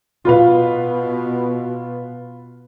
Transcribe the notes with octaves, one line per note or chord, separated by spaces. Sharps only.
B2 F4 B4 F5